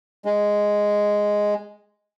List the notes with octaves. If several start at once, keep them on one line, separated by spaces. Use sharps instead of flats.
G#3